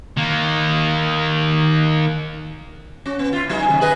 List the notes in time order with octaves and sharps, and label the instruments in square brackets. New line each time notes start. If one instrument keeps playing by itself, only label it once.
[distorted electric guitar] D#3 A#3
[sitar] C#4 F#4
B3
E4 F4
F#3 D#4 G#4
D#2 G#2 C#3
G#4 B4 D#5